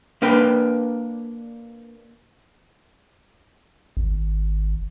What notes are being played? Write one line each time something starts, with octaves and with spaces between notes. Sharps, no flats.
A#3 D4 B4 G5
G#1